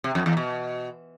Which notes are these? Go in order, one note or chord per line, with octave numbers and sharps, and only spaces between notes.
C3
F2
E2
B2